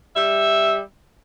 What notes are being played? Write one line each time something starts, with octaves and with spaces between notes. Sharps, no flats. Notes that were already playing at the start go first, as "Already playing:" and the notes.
G3 E5